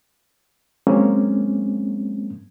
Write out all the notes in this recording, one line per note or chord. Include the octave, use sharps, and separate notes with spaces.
F#3 G#3 A#3 C4 C#4